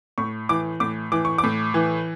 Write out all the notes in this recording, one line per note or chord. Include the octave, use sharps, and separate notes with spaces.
A2 C#6
E3 D6
A2 D6
E3 D6
C#6
D6
A2
E3